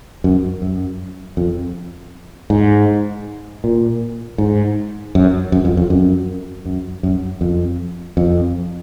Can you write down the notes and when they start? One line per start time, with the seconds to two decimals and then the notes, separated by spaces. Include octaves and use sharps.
0.24 F#2
0.62 F#2
1.37 F2
2.50 G#2
3.64 A#2
4.38 G#2
5.15 F#2
5.52 F#2
5.65 F2
5.77 F2
5.90 F#2
6.66 F#2
7.03 F#2
7.41 F2
8.17 F2